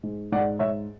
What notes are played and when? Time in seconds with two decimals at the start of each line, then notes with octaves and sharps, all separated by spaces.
0.03 G#2
0.32 G#2 D5 F#5
0.59 G#2 C#5 E5